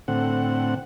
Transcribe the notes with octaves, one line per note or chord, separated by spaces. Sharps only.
A2 D3 C4 F#5